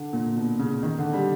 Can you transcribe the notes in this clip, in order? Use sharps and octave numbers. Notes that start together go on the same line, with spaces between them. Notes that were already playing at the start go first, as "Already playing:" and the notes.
Already playing: D3
A#2
B2
C#3
D#3
D3
G3